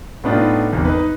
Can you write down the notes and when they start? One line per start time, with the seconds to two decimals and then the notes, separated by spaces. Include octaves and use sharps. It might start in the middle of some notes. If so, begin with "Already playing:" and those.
0.24 A2 B3 D4 D#4 F4
0.73 G#1 E2
0.85 D#4 B4